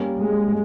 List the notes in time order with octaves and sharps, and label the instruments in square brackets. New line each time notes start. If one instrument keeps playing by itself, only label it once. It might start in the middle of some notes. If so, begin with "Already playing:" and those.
Already playing: [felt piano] G3 A#3 C#4
[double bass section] G#3